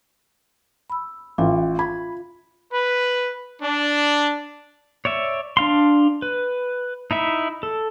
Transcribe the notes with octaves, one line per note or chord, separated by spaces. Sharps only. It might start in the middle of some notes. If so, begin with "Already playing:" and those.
B5 E6
A1 F4 E5 F5
B5 G#6
B4
D4
C#5 D5 E5
D4 F5 C6
B4
D#4 E4 E5
A4